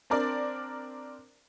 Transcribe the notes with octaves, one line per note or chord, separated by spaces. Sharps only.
C4 D4 A#4 D5